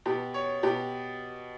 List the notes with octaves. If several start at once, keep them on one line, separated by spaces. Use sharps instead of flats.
B2 G4
C#5
B2 G4